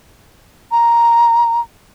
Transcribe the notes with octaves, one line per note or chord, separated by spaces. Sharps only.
A#5